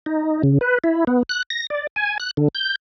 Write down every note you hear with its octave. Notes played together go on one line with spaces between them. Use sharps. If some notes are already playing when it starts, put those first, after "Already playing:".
D#4
C#3
B4
E4
B3
F#6
A#6
D5
G#5
F#6
D3
G6